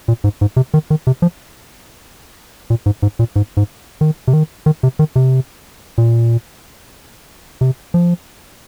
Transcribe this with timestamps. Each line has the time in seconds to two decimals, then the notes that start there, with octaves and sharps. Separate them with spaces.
0.08 A#2
0.24 G#2
0.41 G#2
0.57 C3
0.74 D#3
0.90 D#3
1.07 C3
1.22 F3
2.70 A#2
2.86 G#2
3.02 G#2
3.19 A#2
3.36 G#2
3.57 G#2
4.01 D#3
4.28 C3
4.33 D#3
4.66 D#3
4.83 C3
4.99 D#3
5.16 C3
5.98 A#2
7.61 C3
7.94 F3